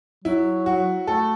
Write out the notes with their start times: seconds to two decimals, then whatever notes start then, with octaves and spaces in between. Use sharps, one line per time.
0.24 F#3 E4
0.66 F#4
1.07 A3 A4